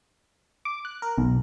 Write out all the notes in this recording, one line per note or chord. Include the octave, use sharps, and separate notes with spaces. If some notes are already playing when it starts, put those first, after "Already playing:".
D6
F#6
A#4
B1